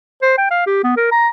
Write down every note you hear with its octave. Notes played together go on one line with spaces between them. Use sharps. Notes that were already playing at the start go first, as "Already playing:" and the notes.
C5
G5
F5
G4
B3
A#4
A#5